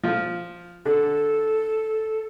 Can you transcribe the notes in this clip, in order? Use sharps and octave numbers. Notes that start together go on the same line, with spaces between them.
F3
D3 A4